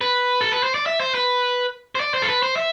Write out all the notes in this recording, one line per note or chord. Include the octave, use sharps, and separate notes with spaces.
B4
A4
B4
C5
D5
E5
C5
B4
C5
D5
C5
A4
B4
C5
E5